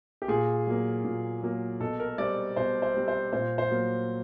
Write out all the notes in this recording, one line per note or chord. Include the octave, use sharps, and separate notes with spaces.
G4
A#2 G#4
F#3 A#3
A#2
F#3 A#3
B2 A4
A#4
G3 C4 D5
B2 C5
C5
G3 C4
C5
A#2 C5
C5
F#3 A#3